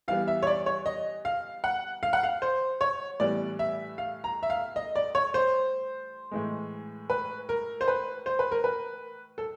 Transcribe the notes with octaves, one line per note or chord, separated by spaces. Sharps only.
E3 G3 B3 F5
E5
C#5
D5
C#5
D#5
F5
F#5
F5
F#5
F5
C5
C#5
A2 E3 G3 B3 D5
E5
F5
A#5
E5
F5
D#5
D5
C#5
C5
A2 E3 G#3
B4
A#4
C5
B4
C5
B4
A#4
B4
A4